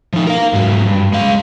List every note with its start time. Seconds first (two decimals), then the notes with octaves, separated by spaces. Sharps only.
0.13 F3 D#4
0.27 A#4 F5
0.53 G#2 F#3
0.86 G2
1.13 G#3 F5